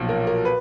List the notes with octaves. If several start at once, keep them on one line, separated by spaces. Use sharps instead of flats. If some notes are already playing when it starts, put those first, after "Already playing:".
Already playing: B1 A#2 F3
A#4
A#4
B4